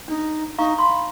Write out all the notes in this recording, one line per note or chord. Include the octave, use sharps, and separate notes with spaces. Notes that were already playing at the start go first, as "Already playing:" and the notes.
D4 D#4
D#4 F5 A#5 C#6
B5 C6